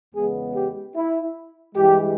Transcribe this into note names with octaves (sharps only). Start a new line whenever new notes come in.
E2 C#3 G#3 B3 G#4
G4
E4
G2 E3 G#3 G4